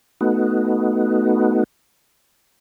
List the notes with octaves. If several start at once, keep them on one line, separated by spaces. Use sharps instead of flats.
A3 B3 D#4 F#4